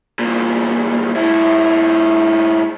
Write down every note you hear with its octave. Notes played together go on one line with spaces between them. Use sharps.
E2 A#2
G#2 E4